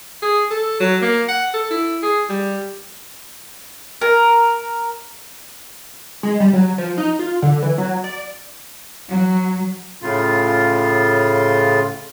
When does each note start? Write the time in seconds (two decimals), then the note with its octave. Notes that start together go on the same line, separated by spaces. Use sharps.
0.22 G#4
0.51 A4
0.80 F#3
1.02 A#3
1.29 F#5
1.54 A4
1.71 E4
2.03 G#4
2.29 G3
4.01 A#4
6.23 G#3
6.40 G3
6.53 F#3
6.78 F3
6.98 D#4
7.19 F4
7.42 D3
7.62 E3
7.78 F#3
8.04 D5
9.08 F#3
10.02 A2 C#3 F4